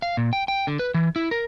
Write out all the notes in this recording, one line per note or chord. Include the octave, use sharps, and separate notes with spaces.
F5
A#2
G5
G5
D3
B4
E3
E4
A#4